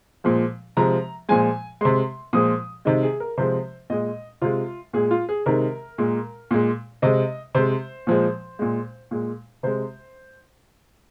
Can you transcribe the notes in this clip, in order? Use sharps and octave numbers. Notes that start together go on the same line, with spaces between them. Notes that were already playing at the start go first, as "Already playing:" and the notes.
A#2 F3 G#3
C3 F3 G#3 A#5
A#2 F3 G#3 G#5
C3 G#3 C6
A#2 F3 G#3 D#6
C3 D#3 G#3 D#5
G#4
A#4
C3 F3 G#3 C5
A#2 G#3 D#5
C3 G#3 F4
A#2 G#3 G#4
F4
G#4
C3 D#3 G#3 A#4
A#2 G#3
A#2 G#3
C3 G#3 D#5
C3 G#3 C5
A#2 F3 G#3
A#2 G#3
A#2 G#3
C3 G#3 C5